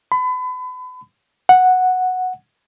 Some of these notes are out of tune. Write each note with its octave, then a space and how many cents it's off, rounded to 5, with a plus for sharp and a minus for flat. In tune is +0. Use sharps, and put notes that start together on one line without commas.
B5 +35
F#5 -5